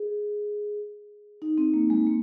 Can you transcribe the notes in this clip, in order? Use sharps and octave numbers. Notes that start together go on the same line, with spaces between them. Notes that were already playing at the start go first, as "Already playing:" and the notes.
Already playing: G#4
D#4
C4
A#3
G#3
A#3